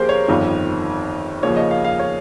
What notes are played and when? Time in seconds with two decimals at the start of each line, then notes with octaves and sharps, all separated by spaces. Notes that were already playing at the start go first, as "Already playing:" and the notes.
Already playing: D#2 C#3 F3 A#3 G4 G#4 A#4 C5
0.09 C#5
0.28 G1 F2 D#3
1.43 D#2 C#3 F3 C#5
1.57 D#5
1.71 F5
1.84 F5
1.99 C#5